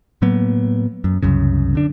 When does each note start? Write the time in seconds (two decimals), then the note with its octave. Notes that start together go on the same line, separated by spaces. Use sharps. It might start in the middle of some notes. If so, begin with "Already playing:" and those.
0.22 A2 F#3 A#3 B3
1.04 F#2
1.23 C2 F#2 C#3
1.75 D3 D4